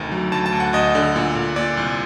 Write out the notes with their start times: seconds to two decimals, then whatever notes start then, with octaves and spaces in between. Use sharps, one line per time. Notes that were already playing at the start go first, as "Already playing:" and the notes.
Already playing: D2 C3 D#3
0.12 F#3
0.32 D2 A5
0.46 A5
0.52 D2
0.60 F#5
0.73 D2 D#5
0.95 D3
1.16 A#2
1.35 A#2
1.56 A#2 D5
1.77 C2